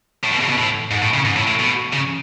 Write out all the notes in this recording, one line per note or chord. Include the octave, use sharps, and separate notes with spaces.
A2
B2
C#3
B2
A2
G#2
A2
C#3
G#2
A2
A2
B2
C#3